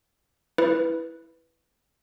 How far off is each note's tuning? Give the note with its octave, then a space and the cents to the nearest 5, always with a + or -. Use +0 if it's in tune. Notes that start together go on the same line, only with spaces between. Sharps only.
E4 +0 B4 +0